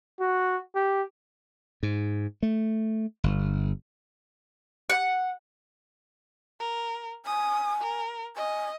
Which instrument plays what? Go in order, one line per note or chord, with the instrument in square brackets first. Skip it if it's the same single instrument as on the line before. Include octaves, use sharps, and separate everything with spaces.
[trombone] F#4
G4
[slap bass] G#2
A3
G1
[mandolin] F#5
[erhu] A#4
[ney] G#5 [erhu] D#6
[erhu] A#4
[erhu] D#5 [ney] G#5